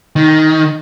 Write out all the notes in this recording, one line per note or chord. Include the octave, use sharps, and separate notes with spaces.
D#3